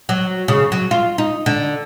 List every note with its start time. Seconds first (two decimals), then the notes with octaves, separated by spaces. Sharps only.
0.09 F#3
0.48 C#3
0.72 F#3
0.91 F4
1.18 D#4
1.46 D3